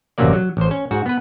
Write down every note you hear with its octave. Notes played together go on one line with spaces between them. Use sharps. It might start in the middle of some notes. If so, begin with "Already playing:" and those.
A1 F#2 C3 F#3 A#3 D5
F#3
A1 C5
C#4
G#2 F#4
B3 B4